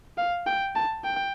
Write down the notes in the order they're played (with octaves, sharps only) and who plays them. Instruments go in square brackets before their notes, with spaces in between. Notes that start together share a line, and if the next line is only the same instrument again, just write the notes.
[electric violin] F5
G5
A5
G5